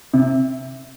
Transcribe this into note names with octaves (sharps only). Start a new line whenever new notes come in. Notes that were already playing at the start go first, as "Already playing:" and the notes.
C3